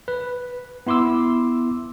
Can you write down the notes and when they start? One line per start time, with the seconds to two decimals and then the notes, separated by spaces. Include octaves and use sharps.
0.08 B4
0.87 B3 E4 C6 D6 E6